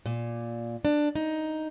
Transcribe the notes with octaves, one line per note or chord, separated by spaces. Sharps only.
A#2
D4
D#4